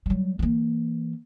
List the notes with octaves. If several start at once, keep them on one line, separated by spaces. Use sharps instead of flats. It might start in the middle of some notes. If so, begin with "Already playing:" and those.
F#3 G3
E3 A#3